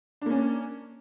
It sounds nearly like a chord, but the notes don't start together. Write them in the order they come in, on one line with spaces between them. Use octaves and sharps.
D4 A#3 C#4